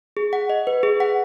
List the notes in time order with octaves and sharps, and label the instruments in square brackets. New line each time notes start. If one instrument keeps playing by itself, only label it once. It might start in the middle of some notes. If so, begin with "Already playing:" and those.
[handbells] G#4
F#5
D#5
B4
G#4
F#5